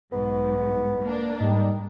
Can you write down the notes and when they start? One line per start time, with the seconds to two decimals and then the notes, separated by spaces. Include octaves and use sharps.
0.12 B1 G#2 B3
1.02 A#3 D4
1.40 G#2 G3 D#4